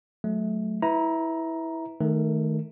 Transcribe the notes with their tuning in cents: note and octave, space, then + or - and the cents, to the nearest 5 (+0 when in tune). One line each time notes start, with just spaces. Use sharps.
F#3 -10 A3 -20
E4 -15 B4 +0 A#5 +10
D#3 +0 A3 -10 A4 +25